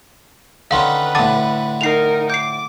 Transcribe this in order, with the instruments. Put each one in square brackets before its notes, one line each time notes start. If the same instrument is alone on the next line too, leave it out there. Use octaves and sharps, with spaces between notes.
[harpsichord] D3 D#3 C#4 [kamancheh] B4 [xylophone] F5 C6
[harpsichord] A2 D3 [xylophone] A5 D6 A6
[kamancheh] D#4 A#4 [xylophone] C7 F7
[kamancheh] D6 [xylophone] G6 C7